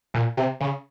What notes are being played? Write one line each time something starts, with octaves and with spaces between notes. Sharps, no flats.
A#2
C3
C#3